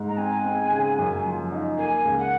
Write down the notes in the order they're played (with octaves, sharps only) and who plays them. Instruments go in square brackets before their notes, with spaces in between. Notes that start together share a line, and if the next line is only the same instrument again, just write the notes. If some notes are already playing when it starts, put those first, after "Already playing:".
Already playing: [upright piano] G#2
[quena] A#5
[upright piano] C4 [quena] G#5
[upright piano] C4
C#3
F#2
F3
D#4
[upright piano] A#3 [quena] G#5
[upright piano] C#2
[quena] F#5